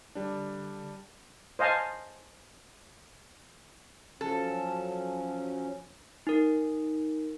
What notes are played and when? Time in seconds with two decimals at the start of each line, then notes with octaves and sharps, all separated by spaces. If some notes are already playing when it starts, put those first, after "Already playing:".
0.15 D3 G3 D4
1.59 C5 D#5 F5 G#5 A5
4.21 F3 F#3 C#4 A4
6.27 D#4 A#4